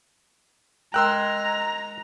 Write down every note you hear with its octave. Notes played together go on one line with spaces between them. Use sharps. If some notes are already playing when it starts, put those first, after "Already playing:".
G#3 A#4 G5 A#5 C6 E6 F#6